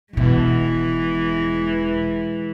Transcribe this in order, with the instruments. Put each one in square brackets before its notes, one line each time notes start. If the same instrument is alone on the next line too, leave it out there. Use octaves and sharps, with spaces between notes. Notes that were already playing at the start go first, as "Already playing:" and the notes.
[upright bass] E1 B2 [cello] E3 G#3